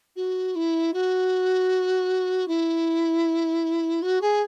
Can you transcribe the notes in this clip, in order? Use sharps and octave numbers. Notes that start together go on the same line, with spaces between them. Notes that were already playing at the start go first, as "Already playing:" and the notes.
F#4
E4
F#4
E4
F#4
G#4